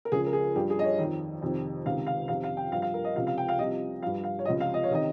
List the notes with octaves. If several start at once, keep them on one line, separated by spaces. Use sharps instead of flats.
A#4
C#2 C#3 F3 G#4
A#4
G#4
G2 F3 G4
G#4
D#5
C#5
F2 D#3
F2 C3 D#3
C#2 C3 D#3 F5
F5
F2 C3 D#3 F5
F5
G5
G2 F3 F5
F5
A#4
D#5
C#2 C3 F3 F5
F5
G5
F5
C2 C3 F3 D#5
G2 F3 F5
F5
C#5
C#2 C3 F3 D#5
F5
D#5
C#5
C3 D#3 D#5